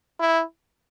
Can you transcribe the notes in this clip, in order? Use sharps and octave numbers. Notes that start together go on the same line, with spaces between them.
E4